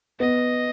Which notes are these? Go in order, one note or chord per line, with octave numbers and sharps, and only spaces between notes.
B3 D#5